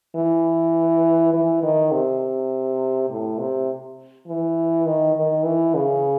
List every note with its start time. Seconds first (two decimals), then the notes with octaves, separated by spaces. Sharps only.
0.16 E3
1.34 E3
1.63 D#3
1.92 C3
3.10 A2
3.39 C3
4.27 E3
4.86 D#3
5.16 D#3
5.45 E3
5.74 C#3